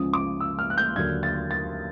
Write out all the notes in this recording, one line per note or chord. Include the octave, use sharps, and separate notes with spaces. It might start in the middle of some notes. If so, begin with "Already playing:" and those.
Already playing: C#2 C#3 F3 D#6
D6
E6
F6
F#6
G6
D#2 D3 F#3 G#6
A6
A6